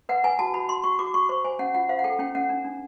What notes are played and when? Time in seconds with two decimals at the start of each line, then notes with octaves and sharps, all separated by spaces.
0.09 B4 F#5
0.24 B4 G#5
0.39 F#4 A5
0.54 F#4 B5
0.68 F#4 C6
0.84 F#4 C#6
0.99 F#4 D6
1.14 F#4 C#6
1.29 C5 C#6
1.44 C5 G#5
1.59 C#4 F#5
1.74 F4 F#5
1.89 C5 F5
1.99 F#5
2.04 A4 G5
2.19 C#4 G5
2.35 C#4 F#5
2.49 D4
2.65 D4